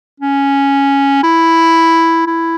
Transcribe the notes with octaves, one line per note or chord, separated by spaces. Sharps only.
C#4
E4
E4